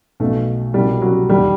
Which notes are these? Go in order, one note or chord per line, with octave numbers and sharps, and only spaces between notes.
B1 B2 A3
C2 B2 G3
F#3
E1 D#2 D#3 G3